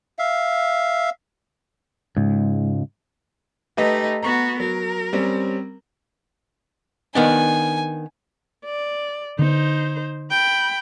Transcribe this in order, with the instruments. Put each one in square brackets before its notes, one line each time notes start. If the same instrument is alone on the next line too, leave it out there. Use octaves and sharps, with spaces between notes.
[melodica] E5 F5
[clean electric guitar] C#2 [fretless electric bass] G#2
[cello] A3 D#4 [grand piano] G4 B4 D#5
[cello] B3 F#4 [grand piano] A#5 C#6
[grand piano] F#3 [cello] A#4
[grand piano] G3 C4 C#4
[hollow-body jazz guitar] D#3 B3 D4 [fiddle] G#5
[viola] D5
[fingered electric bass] D3 B3 [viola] D#4 C5
[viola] G5 B5